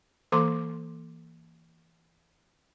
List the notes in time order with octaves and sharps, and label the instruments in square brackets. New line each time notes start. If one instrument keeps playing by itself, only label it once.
[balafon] E3 A#3 A4 A#5 C6 D6